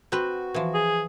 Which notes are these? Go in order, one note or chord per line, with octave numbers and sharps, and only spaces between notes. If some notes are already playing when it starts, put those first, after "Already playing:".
C4 F#4 B4
E3 F3
G#4